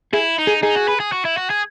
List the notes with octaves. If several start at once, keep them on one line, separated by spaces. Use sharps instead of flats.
E4 G#4
D#4
G#4
D#4 G#4
F#4
B4
G#4
F#4
E4
F#4
G#4